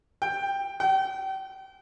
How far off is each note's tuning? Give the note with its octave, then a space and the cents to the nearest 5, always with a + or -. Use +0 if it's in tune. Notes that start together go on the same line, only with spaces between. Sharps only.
G5 +10
G5 -35